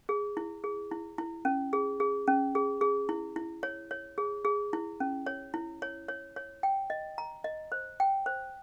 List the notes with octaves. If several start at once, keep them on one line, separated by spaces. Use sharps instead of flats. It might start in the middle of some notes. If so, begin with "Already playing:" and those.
G#4
E4
G#4
E4
E4
C#4
G#4
G#4
C#4
G#4
G#4
E4
E4
C#5
C#5
G#4
G#4
E4
C#4
C#5
E4
C#5
C#5
C#5
G5
D#5
A#5
D#5
C5
G5
C5